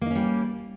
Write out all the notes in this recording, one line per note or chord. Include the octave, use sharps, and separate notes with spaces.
G3 A#3 C#4 D#4